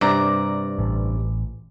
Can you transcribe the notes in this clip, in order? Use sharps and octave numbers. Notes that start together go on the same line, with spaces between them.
G2 C3 D5 A#5
A1